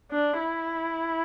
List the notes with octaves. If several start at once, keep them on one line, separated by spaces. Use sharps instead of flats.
D4
E4